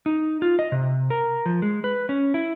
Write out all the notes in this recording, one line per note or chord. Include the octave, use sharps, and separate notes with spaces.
D#4
F4
D#5
C3
A#4
F3
G#3
B4
C#4
E4